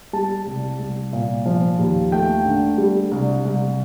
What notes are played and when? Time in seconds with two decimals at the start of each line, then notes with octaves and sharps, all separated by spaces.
0.13 G3 A5
0.46 C2
0.79 C2
1.13 A#2
1.46 F3
1.79 D#2
2.12 A3 G5
2.45 D3
2.78 G3
3.11 C2
3.45 C2